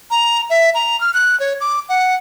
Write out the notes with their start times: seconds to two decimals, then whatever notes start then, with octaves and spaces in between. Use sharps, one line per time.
0.11 A#5
0.50 E5
0.75 A#5
1.01 F6
1.14 F#6
1.40 C#5
1.60 D6
1.89 F#5